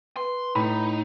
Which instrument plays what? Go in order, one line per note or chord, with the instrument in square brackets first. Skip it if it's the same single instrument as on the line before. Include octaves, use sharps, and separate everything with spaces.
[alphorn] B4 [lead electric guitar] C6
[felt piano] A2 [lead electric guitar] D#4 [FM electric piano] B5